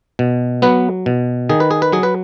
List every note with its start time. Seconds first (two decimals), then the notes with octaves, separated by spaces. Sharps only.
0.19 B2
0.62 F#3 B3 B4
1.06 B2
1.49 D#3 G#4
1.60 B4
1.71 G#4
1.82 B4
1.92 F#3 G#4
2.03 B4